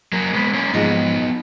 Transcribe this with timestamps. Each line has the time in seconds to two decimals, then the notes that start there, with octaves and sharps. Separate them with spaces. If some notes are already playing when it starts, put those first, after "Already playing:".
0.12 F#3 A#3
0.33 G#3 B3
0.54 A#3 C#4
0.74 G#2 F3 G#3 B3 D#4